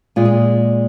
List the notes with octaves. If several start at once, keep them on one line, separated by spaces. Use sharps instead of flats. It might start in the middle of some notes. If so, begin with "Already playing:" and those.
A#2 G#3 F4
G#4